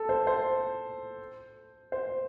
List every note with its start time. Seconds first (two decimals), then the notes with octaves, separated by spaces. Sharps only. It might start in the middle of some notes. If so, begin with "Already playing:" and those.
Already playing: A4
0.09 C5
0.27 C5
1.92 C5